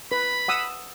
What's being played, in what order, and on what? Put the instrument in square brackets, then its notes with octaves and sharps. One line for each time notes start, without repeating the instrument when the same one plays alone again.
[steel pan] B4 [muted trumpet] B5
[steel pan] F#5 D#6 E6